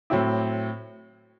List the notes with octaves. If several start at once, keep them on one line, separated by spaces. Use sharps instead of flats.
A2 F#3 C4 E4